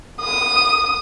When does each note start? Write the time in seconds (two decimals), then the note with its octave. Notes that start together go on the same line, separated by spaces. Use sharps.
0.21 D#6